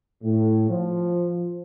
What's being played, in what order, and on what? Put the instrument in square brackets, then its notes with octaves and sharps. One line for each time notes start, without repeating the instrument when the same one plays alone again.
[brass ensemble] A2
F3